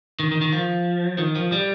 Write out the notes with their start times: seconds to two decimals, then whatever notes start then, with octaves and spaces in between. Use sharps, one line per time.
0.20 D#3
0.31 D#3
0.41 D#3
0.52 F3
1.18 D#3
1.35 F3
1.52 G3